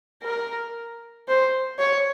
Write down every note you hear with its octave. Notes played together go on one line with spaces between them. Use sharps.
A#4
C5
C#5